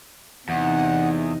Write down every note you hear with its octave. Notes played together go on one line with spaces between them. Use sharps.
E2 C3 D#4 F#5